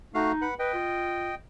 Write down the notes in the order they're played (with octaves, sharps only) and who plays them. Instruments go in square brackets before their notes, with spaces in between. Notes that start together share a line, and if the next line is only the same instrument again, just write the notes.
[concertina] A3 F#4 F5 [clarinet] D#4
[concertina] B4 F#5
[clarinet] B4 [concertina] D#5 G5
[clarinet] F4